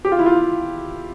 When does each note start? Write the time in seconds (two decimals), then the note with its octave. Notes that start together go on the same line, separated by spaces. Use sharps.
0.05 G4
0.12 F4
0.19 E4
0.26 F4